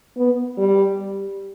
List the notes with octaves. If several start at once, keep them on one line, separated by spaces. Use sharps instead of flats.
B3
G3